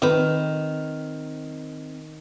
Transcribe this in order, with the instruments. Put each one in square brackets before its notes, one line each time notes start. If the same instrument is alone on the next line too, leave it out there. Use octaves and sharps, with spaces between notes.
[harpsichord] A2 B4 [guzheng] D#3 [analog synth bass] C4